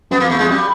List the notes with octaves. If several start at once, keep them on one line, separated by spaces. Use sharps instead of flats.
F#2 B3
F2 A#3
E2 A3
F2 G#3
F#2 G3